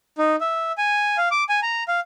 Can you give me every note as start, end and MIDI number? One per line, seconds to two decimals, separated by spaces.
0.18 0.36 63
0.41 0.72 76
0.78 1.17 80
1.17 1.29 77
1.31 1.44 86
1.49 1.60 80
1.63 1.84 82
1.88 2.00 77